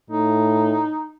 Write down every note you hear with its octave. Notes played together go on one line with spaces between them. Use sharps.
A2 D#4